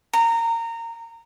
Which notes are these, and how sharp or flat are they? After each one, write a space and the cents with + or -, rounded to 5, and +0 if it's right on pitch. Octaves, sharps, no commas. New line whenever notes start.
A#5 -20